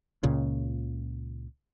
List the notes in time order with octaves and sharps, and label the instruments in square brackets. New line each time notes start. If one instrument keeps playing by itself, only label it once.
[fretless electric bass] C#2 A#2 C#3